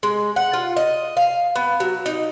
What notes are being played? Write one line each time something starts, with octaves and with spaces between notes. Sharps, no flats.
G#3
F#5
F4
D#5
F5
B3
F#3
D#4